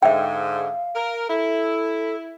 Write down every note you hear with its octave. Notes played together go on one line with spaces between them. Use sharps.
G#2 D3 E5 F5 G5
A#4
E4 A4